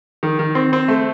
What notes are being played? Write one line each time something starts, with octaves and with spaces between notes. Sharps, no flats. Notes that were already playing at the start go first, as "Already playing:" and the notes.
D#3
D#3
C4
C4
A3